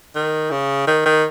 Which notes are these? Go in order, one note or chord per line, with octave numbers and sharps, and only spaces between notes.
D#3
C#3
D#3
D#3